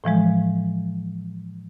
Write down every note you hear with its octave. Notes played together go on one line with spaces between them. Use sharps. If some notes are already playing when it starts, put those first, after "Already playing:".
A2 E3 F3 G#3